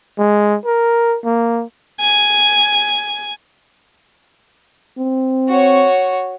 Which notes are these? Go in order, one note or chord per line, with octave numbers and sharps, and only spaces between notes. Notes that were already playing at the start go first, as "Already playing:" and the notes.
G#3
A#4
A#3
G#5
C4
F#4 C#5